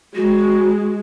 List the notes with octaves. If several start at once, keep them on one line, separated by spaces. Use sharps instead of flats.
G#3 F#4